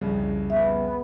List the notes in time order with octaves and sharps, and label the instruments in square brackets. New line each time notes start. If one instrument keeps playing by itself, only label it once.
[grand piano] C2 F2 C#3
[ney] B3 [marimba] E5